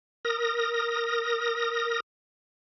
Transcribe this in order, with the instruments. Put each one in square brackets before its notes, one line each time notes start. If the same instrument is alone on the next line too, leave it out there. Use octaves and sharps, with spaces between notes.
[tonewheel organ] A#4 D#6 A#6